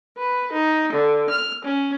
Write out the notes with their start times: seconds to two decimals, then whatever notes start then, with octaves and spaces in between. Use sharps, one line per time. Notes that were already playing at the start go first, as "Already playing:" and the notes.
0.18 B4
0.52 D#4
0.93 D3
1.30 F6
1.64 C#4